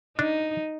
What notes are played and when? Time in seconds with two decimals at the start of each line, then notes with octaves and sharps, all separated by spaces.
0.19 D4 D#4